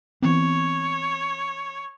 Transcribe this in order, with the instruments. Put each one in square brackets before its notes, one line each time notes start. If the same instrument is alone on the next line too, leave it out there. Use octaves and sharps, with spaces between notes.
[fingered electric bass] E3 B3 C4 [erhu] C#5